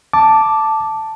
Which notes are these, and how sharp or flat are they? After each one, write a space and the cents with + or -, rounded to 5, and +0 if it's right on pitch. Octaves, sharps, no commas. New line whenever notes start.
A5 +0 D6 +0